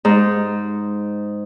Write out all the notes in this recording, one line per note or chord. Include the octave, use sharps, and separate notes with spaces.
G#2